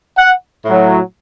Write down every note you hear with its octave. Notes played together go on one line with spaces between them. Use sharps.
F#5
A2 F#3